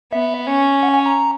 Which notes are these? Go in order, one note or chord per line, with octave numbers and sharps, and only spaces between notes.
B3 E5
C#4
F#5
G#5
A#5